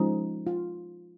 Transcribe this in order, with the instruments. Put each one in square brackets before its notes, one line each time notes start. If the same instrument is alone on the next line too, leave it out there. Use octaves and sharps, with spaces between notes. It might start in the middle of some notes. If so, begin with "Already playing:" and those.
Already playing: [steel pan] F3 G#3 C#4 D#4
F4